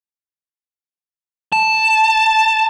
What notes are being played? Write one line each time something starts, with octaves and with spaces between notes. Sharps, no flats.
A5